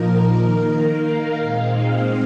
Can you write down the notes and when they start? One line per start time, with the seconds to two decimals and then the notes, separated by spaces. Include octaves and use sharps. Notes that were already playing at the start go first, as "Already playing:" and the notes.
Already playing: A#2 F3 A#3 D#4 A#4
0.34 D#3 A#3 D#4 A#4
0.87 F5
1.40 A#2 G#3 C4 D#4 F5